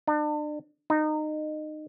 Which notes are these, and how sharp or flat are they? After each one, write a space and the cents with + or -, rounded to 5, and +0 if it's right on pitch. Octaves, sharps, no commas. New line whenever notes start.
D4 +35
D#4 -20